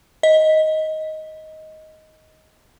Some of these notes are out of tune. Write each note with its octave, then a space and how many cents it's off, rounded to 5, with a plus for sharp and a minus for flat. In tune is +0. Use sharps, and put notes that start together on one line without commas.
D#5 +10